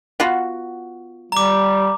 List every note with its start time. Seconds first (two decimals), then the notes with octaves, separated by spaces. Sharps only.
0.20 B3 F4 F#4
1.32 G3 A#5 D6